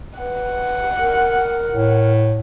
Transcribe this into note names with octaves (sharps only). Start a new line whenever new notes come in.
B4 F#5
A#4
A2